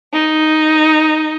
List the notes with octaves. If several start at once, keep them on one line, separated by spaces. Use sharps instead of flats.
D#4